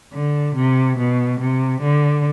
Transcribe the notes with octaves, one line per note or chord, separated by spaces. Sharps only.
D3
C3
B2
C3
D3